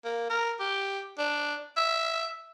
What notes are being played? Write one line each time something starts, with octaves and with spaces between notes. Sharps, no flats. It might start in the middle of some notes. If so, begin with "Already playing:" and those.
A#3
A#4
G4
D4
E5